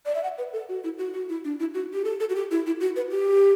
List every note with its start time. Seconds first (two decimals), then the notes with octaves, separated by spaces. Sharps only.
0.06 D5
0.15 E5
0.23 F#5
0.38 B4
0.53 A4
0.69 F#4
0.84 E4
0.98 F#4
1.14 F#4
1.29 E4
1.44 D4
1.60 E4
1.74 F#4
1.94 G4
2.05 A4
2.20 A4
2.30 F#4
2.35 G4
2.51 E4
2.66 E4
2.80 F#4
2.96 B4
3.11 G4